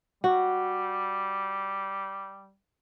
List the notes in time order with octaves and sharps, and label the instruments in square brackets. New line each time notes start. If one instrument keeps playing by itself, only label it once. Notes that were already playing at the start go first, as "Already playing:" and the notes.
[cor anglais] G3 [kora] F#4